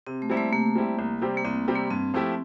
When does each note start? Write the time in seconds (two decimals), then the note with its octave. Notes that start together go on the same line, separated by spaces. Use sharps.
0.07 C3 C4
0.22 A3
0.30 G3 A#3 C4 E4 G4
0.37 A3
0.52 C3 A#3
0.75 G3 C4 E4 G4
0.99 C2
1.21 C3 G3 C4 G4
1.37 A#3
1.45 C2 C4
1.68 C3 G3 C4 G4
1.75 A#3
1.91 G2 C4
2.14 F3 A3 E4 G4